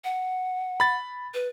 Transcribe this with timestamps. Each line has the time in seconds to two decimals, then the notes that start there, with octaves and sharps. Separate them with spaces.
0.04 F#5
0.80 B5 A6
1.34 B4